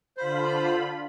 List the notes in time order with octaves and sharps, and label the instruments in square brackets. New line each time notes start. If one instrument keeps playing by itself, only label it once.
[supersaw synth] D3 F4 B5 [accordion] C5